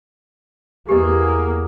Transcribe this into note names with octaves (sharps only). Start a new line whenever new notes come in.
E2 A#3 G4 G#4 B4 D#5